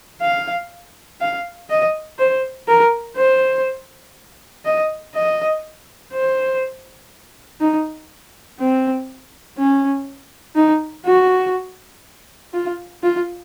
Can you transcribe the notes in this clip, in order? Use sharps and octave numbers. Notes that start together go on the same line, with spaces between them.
F5
F5
D#5
C5
A#4
C5
D#5
D#5
C5
D#4
C4
C#4
D#4
F#4
F4
F4